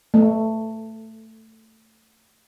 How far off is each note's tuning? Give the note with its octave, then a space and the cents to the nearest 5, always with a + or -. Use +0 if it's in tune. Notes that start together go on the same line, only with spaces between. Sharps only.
A3 +15